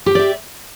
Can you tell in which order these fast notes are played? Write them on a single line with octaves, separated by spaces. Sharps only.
G4 G5 D5 E5